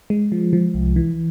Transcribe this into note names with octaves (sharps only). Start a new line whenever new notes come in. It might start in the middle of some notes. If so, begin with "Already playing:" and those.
G#3
F3
F3
C2
E3